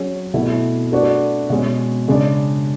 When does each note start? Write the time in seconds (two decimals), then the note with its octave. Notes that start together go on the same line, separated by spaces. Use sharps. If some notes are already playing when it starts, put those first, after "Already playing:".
Already playing: F#3 C#4 G#4
0.34 B2 A3 E4
0.92 A3 D4 F#4 B4 D5
1.50 B2 G#3 C#4
2.08 C#3 G#3 D4 G#4 D5